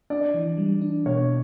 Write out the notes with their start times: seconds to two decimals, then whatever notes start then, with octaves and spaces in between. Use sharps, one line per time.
0.10 D4 D5
0.34 E3
0.57 G3
0.81 D4
1.06 B2 C#5